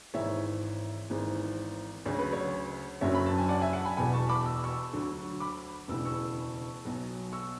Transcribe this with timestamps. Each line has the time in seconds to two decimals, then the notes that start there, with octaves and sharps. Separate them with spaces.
0.14 G#1 G#2 E3 C#5 E5
1.10 G#1 G#2 E3
2.06 D2 C#3 F#3 C#5
2.19 B4
2.32 C#5
3.01 F#1 F#2 D3 F#3 C#5 E5
3.15 B5
3.26 A5
3.38 G#5
3.49 D5 F#5
3.62 E5 G#5
3.73 F#5 A5
3.85 G#5 B5
3.97 E1 E2 B2 G#5 B5
4.13 A5 C#6
4.29 B5 D6
4.46 E6
4.64 C#6 E6
4.93 D2 D3 F#3
5.40 B5 D6
5.88 E1 D2 C#3 E3 E6
6.05 C#6 E6
6.85 B1 B2 F#3
7.32 C#6 E6